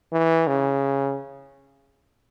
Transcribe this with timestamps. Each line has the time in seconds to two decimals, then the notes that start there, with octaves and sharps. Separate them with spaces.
0.13 E3
0.47 C#3